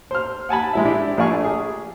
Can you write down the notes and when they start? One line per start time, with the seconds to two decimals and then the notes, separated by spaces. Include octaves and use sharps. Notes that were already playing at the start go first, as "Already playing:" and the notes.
0.11 C5 F6
0.49 F#5 G#5 A5 B5
0.73 G#3 E4 E5
0.85 D4 E4 G4
1.17 A#1 A3 D5 F5 G#5 C#6
1.44 G#4